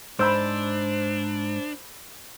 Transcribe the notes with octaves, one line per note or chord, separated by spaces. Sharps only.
G#2 D4 C5 B5 E6 G6